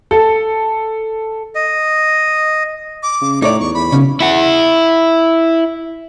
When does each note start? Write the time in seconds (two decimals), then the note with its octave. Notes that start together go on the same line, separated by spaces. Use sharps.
0.11 A4
1.55 D#5
3.03 D6
3.21 C#3
3.42 A2 D#4 C#5 D5 D6
3.60 E2 C#6
3.74 E2 B5
3.92 B1 C#3 C#4
4.20 E4 F#5